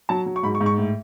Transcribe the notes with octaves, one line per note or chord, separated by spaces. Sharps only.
F#3 A5
F#3
C#6
G#2 B5
C#6
G#2
C#6
A2